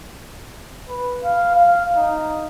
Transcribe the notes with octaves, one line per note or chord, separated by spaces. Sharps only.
B4
F5
F5
D#4